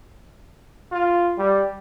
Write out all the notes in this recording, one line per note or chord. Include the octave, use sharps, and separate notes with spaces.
F4
G3